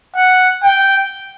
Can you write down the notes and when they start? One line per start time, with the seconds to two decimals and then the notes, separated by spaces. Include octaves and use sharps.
0.16 F#5
0.64 G5